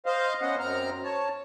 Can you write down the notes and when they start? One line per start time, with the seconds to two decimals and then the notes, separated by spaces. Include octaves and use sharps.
0.06 C5 D#5 F5
0.42 B3 C#4 D#5 F#5
0.60 F#2 C4 A#5 F6
1.04 C#5 A5